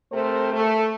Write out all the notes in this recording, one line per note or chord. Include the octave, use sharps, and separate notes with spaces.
C3 A3 A#4 C5
A3